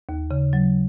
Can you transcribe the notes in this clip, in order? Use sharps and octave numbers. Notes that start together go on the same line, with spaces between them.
D#2
C#3
F#3